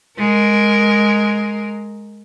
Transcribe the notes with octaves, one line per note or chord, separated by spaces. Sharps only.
G#3 A#4